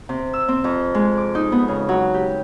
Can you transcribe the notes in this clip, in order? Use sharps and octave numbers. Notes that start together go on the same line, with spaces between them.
C3
E6
C4
F2
G#3
D6
D#4
B3
C#3
F#3
G4